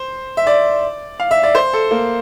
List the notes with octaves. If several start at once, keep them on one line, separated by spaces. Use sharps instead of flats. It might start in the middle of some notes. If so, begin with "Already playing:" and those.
Already playing: C5
E5
D5
F5
E5
D5
C5
A4
A#3